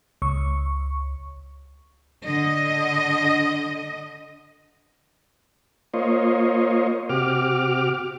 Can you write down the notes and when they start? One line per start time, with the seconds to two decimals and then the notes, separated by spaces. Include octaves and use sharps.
0.22 C#2 C#6
2.22 D3 D#5
5.94 A#3 F4 C5 C#5 D#5
7.09 C3 F#4 G4 D6 F6